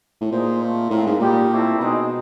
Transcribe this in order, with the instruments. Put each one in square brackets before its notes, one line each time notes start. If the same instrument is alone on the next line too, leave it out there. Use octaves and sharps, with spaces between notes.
[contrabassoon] A2
[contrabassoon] A#2 [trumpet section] D#4 G#4 C5
[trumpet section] A3 C4 F4
[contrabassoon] A2 [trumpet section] G#3 C4 F4 A#4
[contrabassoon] G#2
[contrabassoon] A#2 [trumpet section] G3 A#3 D#4 G4
[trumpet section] A3 C4 E4 A4
[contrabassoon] B2 [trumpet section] G#3 C4 D#4